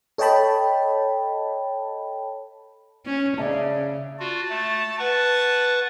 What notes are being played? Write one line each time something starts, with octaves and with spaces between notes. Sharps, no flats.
A4 C#5 D#5 G5 A5 B5
C#4
C#3 D5 E5 A5
F4 F#4 A5
A3
B4 F#5 A5 C#6